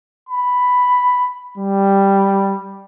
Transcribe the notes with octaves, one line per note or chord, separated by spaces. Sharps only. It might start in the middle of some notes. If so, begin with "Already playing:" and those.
B5
G3